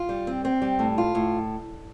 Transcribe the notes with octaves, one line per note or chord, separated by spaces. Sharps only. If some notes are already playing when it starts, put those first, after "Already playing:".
Already playing: F4
G3
C4
C4
G3
A2
F4
A2